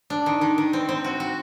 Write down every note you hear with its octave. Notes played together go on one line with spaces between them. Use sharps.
D4
D#3
D#3
D#3
C4
C4
F#4
F#4